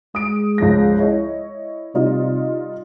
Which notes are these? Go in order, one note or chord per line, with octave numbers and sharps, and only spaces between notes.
G#3 D#6 D7
C#2 F3 A#6
E4 C#5 D#5
C3 G3 D#4 F4